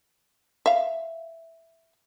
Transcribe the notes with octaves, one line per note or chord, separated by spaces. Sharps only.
E5 F5